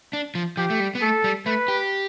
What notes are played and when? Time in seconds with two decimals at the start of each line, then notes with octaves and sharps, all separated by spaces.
0.13 D4
0.35 F3
0.57 F3 G4
0.70 A3
0.80 G3
0.95 B3
1.01 A3 A4
1.24 G3
1.46 A3 B4
1.68 G4